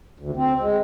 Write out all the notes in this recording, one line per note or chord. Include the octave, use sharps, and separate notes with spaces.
D2
C4
G#3